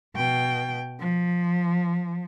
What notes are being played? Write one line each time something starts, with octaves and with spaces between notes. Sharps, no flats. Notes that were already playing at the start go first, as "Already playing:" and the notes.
B2 G5
F3